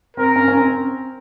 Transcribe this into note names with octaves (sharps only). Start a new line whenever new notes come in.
C4 A#4
C#4
C#4
C4